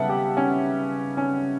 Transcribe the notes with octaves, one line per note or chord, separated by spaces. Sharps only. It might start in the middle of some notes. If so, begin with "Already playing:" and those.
Already playing: C#3 G3 B3 E5 F#5 A5
G4
C#4
C#4